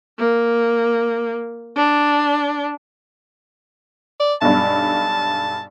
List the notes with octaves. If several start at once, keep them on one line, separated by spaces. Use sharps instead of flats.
A#3
D4
D5
B1 G2 A5